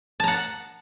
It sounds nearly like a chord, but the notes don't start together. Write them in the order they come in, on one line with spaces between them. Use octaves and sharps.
A5 A#5 F#5